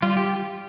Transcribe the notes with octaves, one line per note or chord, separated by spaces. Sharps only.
G3 F4
G4